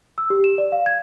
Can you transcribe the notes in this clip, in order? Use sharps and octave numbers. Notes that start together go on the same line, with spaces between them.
E6
G4
E7
D5
F5
G#6